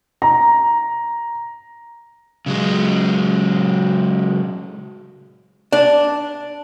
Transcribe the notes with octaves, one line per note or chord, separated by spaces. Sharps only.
A#5
C#3 F#3 G#3
D4